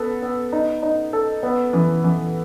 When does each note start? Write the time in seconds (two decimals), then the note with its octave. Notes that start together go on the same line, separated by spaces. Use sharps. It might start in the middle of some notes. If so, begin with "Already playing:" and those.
Already playing: B3 A4
0.22 B3
0.53 D#4
0.82 D#4
1.13 A4
1.43 B3
1.73 E3
2.04 E3